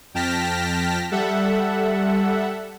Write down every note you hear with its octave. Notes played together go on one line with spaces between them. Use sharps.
F2 G5 A5 F6 A#6 B6
G3 A4 E5 F#5